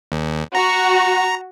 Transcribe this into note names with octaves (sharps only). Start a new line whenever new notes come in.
D#2
F#4 A#5